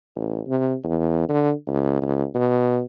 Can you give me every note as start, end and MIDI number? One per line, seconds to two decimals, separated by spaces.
0.16 0.40 33
0.47 0.75 48
0.84 1.26 40
1.29 1.52 50
1.67 1.98 37
2.02 2.25 37
2.35 2.82 47